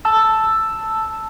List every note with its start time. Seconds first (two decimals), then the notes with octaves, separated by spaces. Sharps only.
0.05 A5 E6